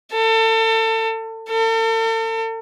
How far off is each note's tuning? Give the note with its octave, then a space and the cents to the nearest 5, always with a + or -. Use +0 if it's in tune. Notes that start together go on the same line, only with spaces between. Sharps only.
A4 +30
A4 +40